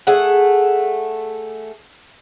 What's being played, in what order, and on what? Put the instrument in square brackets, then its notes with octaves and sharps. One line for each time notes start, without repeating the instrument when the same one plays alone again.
[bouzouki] A3 G#4 F#5